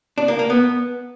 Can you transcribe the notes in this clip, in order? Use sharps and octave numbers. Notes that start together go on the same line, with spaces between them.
D4
A#3
A#3
B3